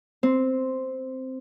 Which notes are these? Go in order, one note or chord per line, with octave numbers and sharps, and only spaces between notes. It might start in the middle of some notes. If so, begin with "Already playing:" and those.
C4